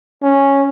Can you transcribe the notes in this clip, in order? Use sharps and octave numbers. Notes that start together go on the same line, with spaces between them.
C#4